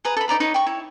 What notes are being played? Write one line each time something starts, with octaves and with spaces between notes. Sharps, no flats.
G#4 B4 A#5
A4 B5
D#4 D5 A#5 B5
D#4 B4 C#5 B5
G5 B5 C#6
E4 C#5